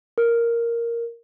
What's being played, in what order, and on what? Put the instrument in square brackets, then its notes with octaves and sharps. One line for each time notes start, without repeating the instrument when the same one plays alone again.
[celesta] A#4